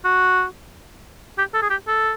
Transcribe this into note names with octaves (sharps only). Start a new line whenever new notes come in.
F#4
G4
A4
G#4
G4
A4